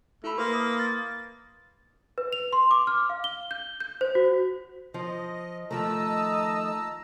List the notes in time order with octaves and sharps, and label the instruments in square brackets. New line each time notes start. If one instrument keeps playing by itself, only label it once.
[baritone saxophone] A3 [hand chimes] E4 B5
[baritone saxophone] A#3 [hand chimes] A#4 B4 C6
[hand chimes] D#6
A6
[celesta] B4
F7
C6
D6
F6
F5
G7
G6
G6
C5
F#4
[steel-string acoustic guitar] F3 [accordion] D#5
[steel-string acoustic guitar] D#3 F3 A3 [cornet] D#5 [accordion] A5 A#5 E6